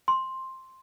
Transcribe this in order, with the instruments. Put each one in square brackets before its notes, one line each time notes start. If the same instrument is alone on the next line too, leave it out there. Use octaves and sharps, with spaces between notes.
[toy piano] C6